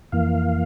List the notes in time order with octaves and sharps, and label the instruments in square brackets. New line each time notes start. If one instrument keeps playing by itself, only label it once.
[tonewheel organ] F2 E3 A#3 F5